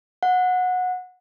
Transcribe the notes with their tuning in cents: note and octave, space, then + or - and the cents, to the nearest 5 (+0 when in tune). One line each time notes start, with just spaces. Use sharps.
F#5 -20